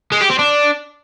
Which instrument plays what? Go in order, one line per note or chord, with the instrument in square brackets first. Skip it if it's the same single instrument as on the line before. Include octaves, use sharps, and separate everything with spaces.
[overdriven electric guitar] G#3
G4
C4
D4